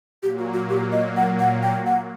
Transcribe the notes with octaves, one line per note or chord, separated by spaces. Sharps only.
A#2 F#3 A#3 G4
F#4
F#4
G4
D#5
F#5
F#5
G5
F#5